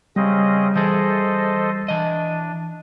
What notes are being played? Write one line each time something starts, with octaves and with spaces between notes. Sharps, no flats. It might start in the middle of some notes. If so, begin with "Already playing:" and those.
C#3 G3 C4 D#5
E3 G#4 A4 C5 D#5
E3 D4 D#5